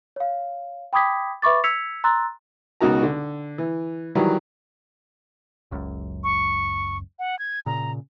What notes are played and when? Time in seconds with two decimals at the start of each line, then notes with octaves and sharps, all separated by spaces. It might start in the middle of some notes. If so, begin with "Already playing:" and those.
0.16 C#5 F5
0.93 G5 B5 D6 D#6 G#6 B6
1.42 B4 E5 B5 C#6 D6 A6
1.64 E6 G#6 B6 C#7 F7
2.04 A#5 C6 E6 F#6 A6
2.81 C#2 B2 D#4 F#4 A#4 A#5
3.03 D3
3.58 E3
4.15 D#3 E3 F#3 G3
5.71 F#1 C#2 F#2
6.24 C#6
7.19 F#5
7.39 G#6
7.66 A#2 C#3 A#5